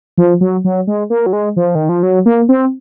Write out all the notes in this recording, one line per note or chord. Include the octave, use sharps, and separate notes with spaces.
F3
F#3
F#3
G#3
A#3
F#3
G#3
F3
D#3
F3
F#3
A#3
C4